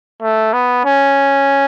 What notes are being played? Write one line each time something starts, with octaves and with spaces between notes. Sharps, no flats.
A3
B3
C#4